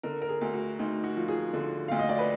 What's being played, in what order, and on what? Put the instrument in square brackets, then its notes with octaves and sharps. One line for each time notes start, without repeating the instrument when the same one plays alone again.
[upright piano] D3 A#4
A#4
G#4
D2
F#4
D2 D#4
F#4
F3
G#4
D3
D2 F5
D#5
D5
B4